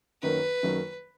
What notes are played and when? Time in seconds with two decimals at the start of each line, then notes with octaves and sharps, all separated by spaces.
0.22 F#2 D#3 F#3 A#3 B4
0.63 F#2 D#3 F#3 A#3